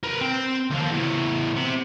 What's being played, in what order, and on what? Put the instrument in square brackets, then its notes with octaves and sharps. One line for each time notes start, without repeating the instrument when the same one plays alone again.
[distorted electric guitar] A#4 B4
C4 G5
D#2 F3
E2 A2
C3